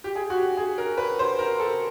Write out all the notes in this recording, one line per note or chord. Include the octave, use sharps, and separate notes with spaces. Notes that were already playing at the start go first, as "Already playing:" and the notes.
G4
G#4
F#4
G4
G#4
A#4
B4
C5
A#4
A4